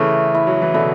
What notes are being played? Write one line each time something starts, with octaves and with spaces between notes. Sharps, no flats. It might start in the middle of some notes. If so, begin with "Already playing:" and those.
Already playing: C#3 E3 A3
E4
F#3
E3
B2 D3 E4